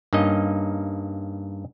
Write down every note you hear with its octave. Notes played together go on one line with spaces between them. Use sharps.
G2 A#3 C#4 D#4 D#5